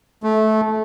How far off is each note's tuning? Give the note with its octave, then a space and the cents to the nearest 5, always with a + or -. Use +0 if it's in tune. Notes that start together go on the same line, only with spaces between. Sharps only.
A3 -20